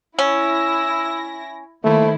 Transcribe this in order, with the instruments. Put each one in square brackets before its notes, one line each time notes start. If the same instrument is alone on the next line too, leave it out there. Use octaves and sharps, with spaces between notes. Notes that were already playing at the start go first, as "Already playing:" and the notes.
[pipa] C#4 [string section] E4 A#6 [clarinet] E6
[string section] D#3 E4 C5 [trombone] A3 [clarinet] A#3